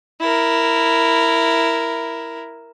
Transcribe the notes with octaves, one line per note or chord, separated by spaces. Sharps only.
E4 A#4